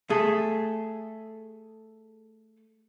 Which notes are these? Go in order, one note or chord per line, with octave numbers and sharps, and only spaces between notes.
A3 G#4